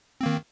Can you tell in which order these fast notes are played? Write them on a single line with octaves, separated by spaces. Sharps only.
C4 A#3 D#3